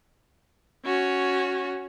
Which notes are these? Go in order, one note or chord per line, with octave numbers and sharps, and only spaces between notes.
C#4 F#4